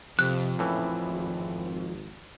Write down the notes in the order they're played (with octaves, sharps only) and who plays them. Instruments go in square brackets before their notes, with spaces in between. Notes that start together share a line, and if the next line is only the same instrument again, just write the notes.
[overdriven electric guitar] F2 [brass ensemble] C3 [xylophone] F#6
[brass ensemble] A#1 C#3 [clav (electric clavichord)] A2 E3
[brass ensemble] G#1